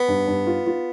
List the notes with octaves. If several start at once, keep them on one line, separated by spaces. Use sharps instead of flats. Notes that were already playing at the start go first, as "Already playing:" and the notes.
Already playing: B3
G2
G2
F4
F4